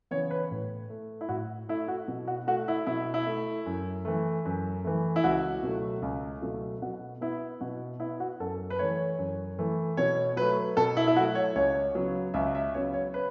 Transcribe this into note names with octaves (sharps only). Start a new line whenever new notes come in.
C#3 E3 B3 C#5
B4
A2
A3
E4
A2 F#4
A3 E4
F#4
B2
F#4
A3 F#4
E4
B2 E4
E4
A3
F#2
E3 A3
F#2
E3 A3
E4
C#2 F#4
B2 F#3 A3
C#2
B2 F#3 A3
B2 F#4
B3 E4
B2 F#4
B3 E4
F#4
F#2 A4
B4
E3 A3 C#5
F#2
E3 A3
B2 C#5
F#3 A3 B4
B2 A4
E4
E4
F#3 A3 F#4
C#5
C#2 C#5
C#3 F#3 B3
C#2 E5
E5
C#3 F#3 B3 C#5
C#5
B4